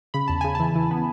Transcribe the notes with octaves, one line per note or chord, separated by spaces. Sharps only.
C#3 B5
E2 A5
C#3 G#5
E3 A5
E3
B3